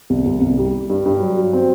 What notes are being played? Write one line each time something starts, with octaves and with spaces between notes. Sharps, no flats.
C2
C2
C2
G3
G3
G2
G2
F#3
F#3
C4